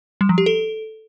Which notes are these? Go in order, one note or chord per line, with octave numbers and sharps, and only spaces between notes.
G3
F3
G4
A4